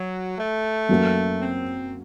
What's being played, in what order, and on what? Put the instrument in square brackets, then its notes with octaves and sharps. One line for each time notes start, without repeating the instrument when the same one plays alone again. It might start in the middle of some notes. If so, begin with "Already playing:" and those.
Already playing: [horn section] F#3
A3
[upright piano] F#2 F#3 A#3
[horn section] C4